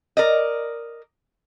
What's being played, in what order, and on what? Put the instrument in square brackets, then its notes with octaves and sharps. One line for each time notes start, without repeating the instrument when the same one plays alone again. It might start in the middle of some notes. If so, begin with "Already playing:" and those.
[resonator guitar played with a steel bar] A#4 D5 D#5